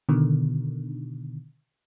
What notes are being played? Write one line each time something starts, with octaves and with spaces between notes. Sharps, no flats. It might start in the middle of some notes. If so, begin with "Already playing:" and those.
B2 D3 D#3